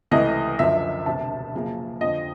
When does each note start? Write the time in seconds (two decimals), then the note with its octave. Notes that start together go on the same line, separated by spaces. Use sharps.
0.11 C#2 C3 E3 A3 D#5
0.59 F#1 F#2 D3 F3 E5
1.06 E1 D2 C3 A5
1.54 F#2 C#3 F3 A#3
2.01 F2 D3 F3 D#5